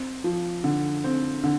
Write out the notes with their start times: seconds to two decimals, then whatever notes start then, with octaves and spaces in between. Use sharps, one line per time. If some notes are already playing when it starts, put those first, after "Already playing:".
Already playing: C4
0.24 F3
0.64 D3
1.04 C4
1.44 D3